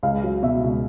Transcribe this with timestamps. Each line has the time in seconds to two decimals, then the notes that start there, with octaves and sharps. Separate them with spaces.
0.03 C#2 F5
0.23 F#3
0.43 B2 E5
0.62 C#2